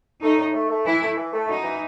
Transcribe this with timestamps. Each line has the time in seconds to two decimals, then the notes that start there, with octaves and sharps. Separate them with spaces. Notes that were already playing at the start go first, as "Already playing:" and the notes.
0.22 A3 D#4
0.38 A2
0.53 A3
0.69 A3
0.86 E3 E4
1.01 A3
1.17 E3
1.33 A3
1.48 F#2 D#4
1.64 E3